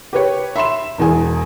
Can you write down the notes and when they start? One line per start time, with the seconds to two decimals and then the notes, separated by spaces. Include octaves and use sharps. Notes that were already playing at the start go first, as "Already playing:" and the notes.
0.13 G4 B4 C#5
0.56 E5 B5 C6 E7
0.98 E1 E2 G#4 G#5